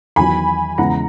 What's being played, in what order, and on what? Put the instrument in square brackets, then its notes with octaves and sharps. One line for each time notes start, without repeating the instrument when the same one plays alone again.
[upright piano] E2 D#3 F#3 [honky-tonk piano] G#5 B5
[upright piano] E2 C#3 G#3 B3 E4 [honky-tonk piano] F#5 A#5